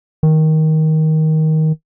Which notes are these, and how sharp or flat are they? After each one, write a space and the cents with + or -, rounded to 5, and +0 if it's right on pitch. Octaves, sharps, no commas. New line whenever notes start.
D#3 +15